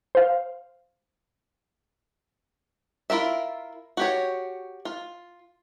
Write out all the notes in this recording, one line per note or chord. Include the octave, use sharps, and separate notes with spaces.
C5 F5
E4 F4 A#4 E5
F#4 G4 C#5
F4